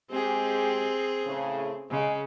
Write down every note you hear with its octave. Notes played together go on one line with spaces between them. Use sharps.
G#3 C4 G4 G#4
A2 C#3
C#3 G#3